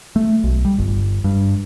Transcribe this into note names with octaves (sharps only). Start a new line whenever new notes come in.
A3
B1
G3
G1
G2